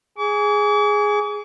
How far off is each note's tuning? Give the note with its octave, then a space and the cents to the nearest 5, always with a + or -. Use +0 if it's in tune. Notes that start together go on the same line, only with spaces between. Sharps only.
G#4 +0 D6 -45